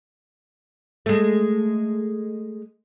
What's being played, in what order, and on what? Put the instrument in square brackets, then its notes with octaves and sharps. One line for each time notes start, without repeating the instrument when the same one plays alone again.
[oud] G#3 A3